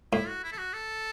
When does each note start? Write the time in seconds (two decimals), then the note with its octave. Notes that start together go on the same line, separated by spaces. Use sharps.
0.13 A2 E4
0.28 F#4
0.44 E4
0.52 A4
0.58 F#4
0.74 A4